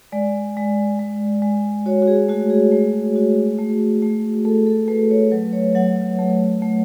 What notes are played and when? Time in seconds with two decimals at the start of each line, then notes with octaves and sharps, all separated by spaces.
0.12 G#3 D5
0.57 G#3
0.99 G#3
1.42 G#3
1.86 F#4 C#5
2.02 F#4
2.07 G#4
2.28 A3 F#4
2.50 G#4
2.72 A3
3.16 F#4
3.58 A3
4.03 A3
4.45 A3 A4
4.66 A4
4.88 A3 B4
5.11 C#5
5.31 F#3 B4
5.53 C#5
5.75 F#3 F#5
5.96 F#5
6.19 A3
6.62 A3